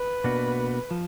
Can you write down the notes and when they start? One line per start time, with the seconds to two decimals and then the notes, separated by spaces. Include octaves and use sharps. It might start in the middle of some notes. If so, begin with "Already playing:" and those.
Already playing: B4
0.24 B2 A#3 D4 F#4
0.91 F3